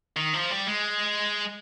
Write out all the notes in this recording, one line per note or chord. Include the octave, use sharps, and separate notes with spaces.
D#3
F3
G3
G#3